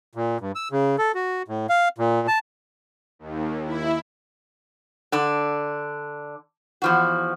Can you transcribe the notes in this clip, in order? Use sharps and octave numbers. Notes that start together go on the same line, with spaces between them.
A#2
G2
E6
C#3
A4
F#4
A2
F5
A#2
A5
D#2
E4
D3 D4
E2 F3 F#4